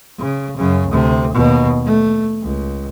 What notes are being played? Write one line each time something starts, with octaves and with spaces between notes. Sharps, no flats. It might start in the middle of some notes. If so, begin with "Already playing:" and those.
C#3
F#2 C#3
D2 C3
D#2 B2
A3
C#2